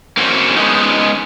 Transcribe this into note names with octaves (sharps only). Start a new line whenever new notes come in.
A#3 C4 C#4 F#4
G#3 B3 C#4 D#4